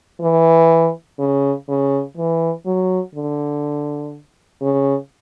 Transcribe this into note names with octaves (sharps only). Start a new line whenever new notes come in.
E3
C#3
C#3
E3
F#3
D3
C#3